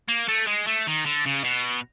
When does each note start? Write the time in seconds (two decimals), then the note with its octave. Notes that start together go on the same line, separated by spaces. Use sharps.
0.08 A#3
0.28 A3
0.47 G#3
0.67 A3
0.87 D#3
1.06 D3
1.26 C#3
1.44 B2